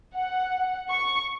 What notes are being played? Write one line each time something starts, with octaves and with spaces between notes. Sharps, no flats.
F#5
C#6